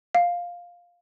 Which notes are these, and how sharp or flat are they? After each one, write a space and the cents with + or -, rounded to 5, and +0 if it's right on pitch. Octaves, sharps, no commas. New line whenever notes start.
F5 +5